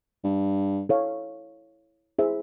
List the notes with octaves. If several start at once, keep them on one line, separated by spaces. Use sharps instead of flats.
G2
E4 A4 C#5 F5
E4 G#4 C5 E5